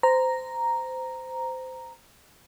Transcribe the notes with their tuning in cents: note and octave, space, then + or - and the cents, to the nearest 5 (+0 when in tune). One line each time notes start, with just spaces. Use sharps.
C5 -20 A#5 +0